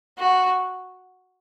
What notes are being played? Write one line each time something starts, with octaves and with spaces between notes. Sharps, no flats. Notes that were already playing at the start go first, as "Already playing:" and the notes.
F#4